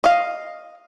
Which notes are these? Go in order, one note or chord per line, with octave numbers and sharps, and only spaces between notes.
D#5 F5